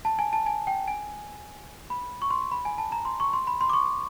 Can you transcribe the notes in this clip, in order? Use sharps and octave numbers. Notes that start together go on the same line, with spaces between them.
A5
G#5
A5
G#5
G5
G#5
B5
C#6
C6
B5
G#5
A5
A#5
C6
C#6
C6
B5
C6
D6
C#6